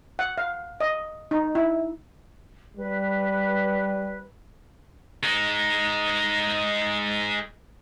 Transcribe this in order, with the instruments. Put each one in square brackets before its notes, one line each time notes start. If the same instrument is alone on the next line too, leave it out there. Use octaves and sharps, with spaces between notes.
[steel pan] F#5
F5
D#5
D#4
E4
[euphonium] G3 [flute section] B4
[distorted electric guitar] G#3 D#4